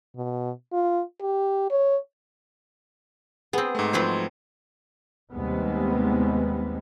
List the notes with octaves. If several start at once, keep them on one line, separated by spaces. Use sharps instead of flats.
B2
F4
G4
C#5
B3 C4 G#4
G#2 A3
F3 F#3 C4 B4 C5
D#2 C3 G3 G#3 B3